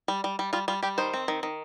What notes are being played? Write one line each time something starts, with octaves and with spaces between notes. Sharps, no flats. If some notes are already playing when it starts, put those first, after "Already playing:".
G3
G3
G3
G3 F4
G3 F4
G3 G4
D#3 C5
C4
D#3
D#3